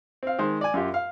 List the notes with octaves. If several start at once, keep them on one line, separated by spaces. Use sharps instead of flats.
C4 F5
D#3 G#3 C5
D5 G#5
F#2 F4 G4
F5